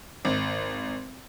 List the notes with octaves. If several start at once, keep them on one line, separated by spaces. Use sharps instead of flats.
G#1